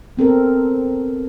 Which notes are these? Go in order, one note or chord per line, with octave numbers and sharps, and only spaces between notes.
B3 C4 A4 A#4